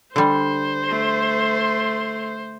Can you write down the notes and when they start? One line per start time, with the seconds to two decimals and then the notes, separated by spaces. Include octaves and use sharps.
0.16 D3 G3 C5
0.84 A3 C6